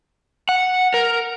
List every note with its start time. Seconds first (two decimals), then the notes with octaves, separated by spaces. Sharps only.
0.49 F#5
0.94 A#4